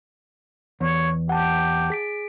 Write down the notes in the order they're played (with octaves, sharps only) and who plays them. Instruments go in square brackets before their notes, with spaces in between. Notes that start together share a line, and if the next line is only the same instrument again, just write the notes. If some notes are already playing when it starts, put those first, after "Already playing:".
[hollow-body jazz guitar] E2 [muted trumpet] C#5
[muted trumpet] G4 [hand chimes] F#5 A5
[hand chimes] G#4 B6 D7